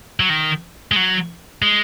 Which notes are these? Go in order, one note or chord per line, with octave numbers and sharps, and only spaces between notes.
F#3
D#3
G#3
F#3
G#3